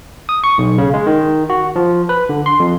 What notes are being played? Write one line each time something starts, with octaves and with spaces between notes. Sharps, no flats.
D#6
C#6
B1
C#3
G#3
D#3
F#4
F3
B4
D3
C6
F2